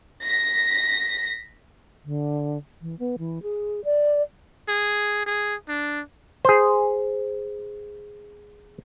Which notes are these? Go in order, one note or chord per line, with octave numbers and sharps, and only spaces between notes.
A#6 B6
D3
E3
B3
E3
G#4
D5
G#4
G#4
D4
G#4 C5